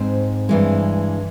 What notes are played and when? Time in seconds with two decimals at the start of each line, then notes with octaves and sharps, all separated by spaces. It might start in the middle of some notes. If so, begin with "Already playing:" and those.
Already playing: G#2 C4 C5
0.49 G2 E3 G#3